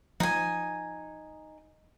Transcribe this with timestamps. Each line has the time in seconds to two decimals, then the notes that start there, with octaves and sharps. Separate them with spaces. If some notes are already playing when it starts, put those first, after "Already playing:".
0.20 F3 D#4 G#5